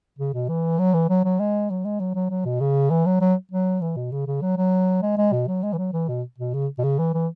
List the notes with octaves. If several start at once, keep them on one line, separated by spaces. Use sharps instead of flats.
C#3
B2
E3
F#3
E3
F#3
F#3
G#3
F#3
G#3
F#3
F#3
F#3
B2
C#3
E3
F#3
F#3
F#3
E3
B2
C#3
C#3
F#3
F#3
G#3
G#3
B2
F#3
G#3
E3
F#3
E3
B2
B2
C#3
B2
C#3
E3
E3